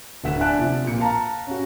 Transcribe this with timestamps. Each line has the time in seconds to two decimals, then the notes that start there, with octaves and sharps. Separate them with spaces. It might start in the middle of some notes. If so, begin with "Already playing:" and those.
0.24 D1 D3 E5 F#5 B6 E7
0.40 D4 E5 G#5 A5 F#6 D7
0.58 C3 F3
0.84 A#2 F4 C#7
1.00 F5 A5 A#5
1.47 C#4 F#4